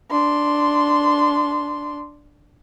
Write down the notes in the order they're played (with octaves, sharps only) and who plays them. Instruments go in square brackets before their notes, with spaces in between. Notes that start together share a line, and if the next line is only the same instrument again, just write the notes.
[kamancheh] D4 C6